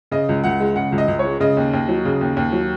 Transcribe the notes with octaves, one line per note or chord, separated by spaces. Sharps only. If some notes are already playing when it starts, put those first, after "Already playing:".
C#3 D#5
C#2
C#2 F#5
G#3
C#3 F#5
C#2
D#5
C#2
C#5
G#3
C#3 D#5
D#2
D#2
F#3
C#3
D#2
D#2
F#3